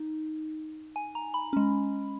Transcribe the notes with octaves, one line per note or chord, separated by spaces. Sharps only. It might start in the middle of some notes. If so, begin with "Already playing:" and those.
Already playing: D#4
G#5
A#5
B5
G#3 C#4